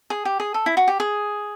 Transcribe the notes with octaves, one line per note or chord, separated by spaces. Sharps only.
G#4
G4
G#4
A4
E4
F#4
G4
G#4